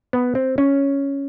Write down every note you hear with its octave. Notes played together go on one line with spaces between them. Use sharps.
B3
C4
C#4